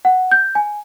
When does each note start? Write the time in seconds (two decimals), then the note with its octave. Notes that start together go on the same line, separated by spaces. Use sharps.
0.05 F#5
0.32 G6
0.55 G#5